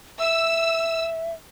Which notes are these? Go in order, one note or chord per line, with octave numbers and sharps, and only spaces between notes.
E5 E6